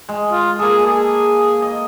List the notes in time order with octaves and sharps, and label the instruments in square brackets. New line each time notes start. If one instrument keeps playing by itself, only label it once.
[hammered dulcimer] G#3
[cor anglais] F4
[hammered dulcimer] A#3 A4 [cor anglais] G#4
[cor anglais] G#4
[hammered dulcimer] D#5